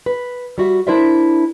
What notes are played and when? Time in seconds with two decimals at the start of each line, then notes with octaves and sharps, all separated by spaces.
0.06 B4
0.58 G3 F#4 E5
0.87 D4 E4 A#4 C5 D5 E5